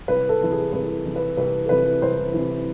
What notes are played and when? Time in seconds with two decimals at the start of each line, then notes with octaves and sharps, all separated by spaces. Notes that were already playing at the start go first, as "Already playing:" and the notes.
0.08 C2 B4
0.29 A4
0.41 C3 E3
0.52 G#4
0.73 C2 B4
1.05 C3 E3
1.16 B4
1.37 C2 B4
1.66 A4
1.69 C3 E3 B4
2.02 C2 C5
2.34 C3 E3